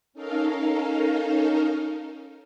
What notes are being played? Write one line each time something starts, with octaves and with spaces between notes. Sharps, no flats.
C#4 D#4 A4 A#4 F5